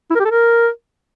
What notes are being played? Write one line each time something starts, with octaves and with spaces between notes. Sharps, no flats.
E4
A#4
G4
A4
A#4